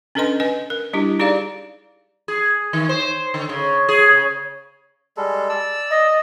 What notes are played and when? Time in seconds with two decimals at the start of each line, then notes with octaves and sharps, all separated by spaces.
0.15 C#4 D4 A4 B4 D#5 C6
0.40 B4 D#5 G#5
0.70 A#4
0.93 G3 D4 E4 G4
1.19 D#4 G4 G#4 D5 F5
2.28 G#4
2.73 D#3
2.89 C5
3.34 D3
3.49 C#3
3.89 G#4
4.11 C#3
5.17 G3 G#3 A4
5.49 D5 E6
5.90 D#5